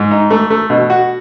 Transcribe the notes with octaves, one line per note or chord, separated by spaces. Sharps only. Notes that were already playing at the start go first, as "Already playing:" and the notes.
Already playing: G#2
D#4
A3
A3
B2
F#4